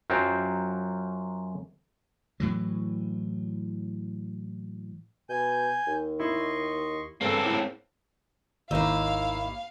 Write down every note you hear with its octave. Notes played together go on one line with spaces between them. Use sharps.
F#2 F#3 F4 C5 G5 A#5
A2 E3 F#3
B2 G#5 G6
D#2
E4 D#5 C6 C#6
G2 C#3 A#3 C4 A4 D6
A2
G#1 D#2 D#3 A#3 D#4 E4 F5 E6